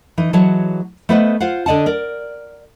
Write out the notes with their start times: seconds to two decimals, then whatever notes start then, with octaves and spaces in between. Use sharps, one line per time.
0.18 E3 D#4
0.33 E3 F#3 G#3 C#5 A5
1.09 A3 B3 B4 C5 D#5 F#5
1.40 F4 C5 F5 F#5
1.66 D3 D4 D5 D#5 F#5 A5
1.86 A#4 D5